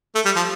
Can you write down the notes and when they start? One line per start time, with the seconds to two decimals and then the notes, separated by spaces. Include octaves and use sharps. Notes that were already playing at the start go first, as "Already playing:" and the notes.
0.15 A3
0.25 G3
0.36 F3